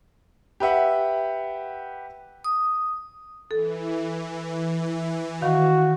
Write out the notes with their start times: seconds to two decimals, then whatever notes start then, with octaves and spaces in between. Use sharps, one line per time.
0.60 G4 B4 E5 F#5
2.44 D#6
3.51 E3 A4
5.42 D#3 F#4 F5